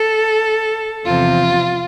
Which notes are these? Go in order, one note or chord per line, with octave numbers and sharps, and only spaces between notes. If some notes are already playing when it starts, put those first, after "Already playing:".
Already playing: A4
E2 C3 F3 C4 F4